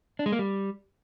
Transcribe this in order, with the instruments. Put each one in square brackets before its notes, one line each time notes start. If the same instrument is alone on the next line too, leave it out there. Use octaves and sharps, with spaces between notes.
[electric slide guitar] D4
G#3
A#3
G3